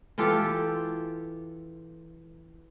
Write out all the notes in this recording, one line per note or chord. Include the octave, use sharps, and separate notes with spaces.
E3 F4 G4 A4